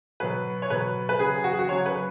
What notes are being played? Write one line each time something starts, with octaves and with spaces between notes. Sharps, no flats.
B2 F#3 B4
C#5
B2 F#3 B4
B4
C#3 F#3 G#4
F#4
G#4
F#4
C#3 F#3 C#5
B4